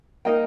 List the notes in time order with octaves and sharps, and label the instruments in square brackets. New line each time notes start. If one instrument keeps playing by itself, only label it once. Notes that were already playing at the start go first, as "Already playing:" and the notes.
[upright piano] A#3 [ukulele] D#4 A#4 D#5 G5